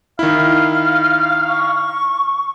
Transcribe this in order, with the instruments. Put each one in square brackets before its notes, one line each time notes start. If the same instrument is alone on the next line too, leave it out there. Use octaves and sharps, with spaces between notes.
[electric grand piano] D#3 E4 [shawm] F5
[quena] C#6